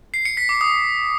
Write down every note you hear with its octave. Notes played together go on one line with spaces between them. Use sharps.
C7
C#7
B6
D6
D#6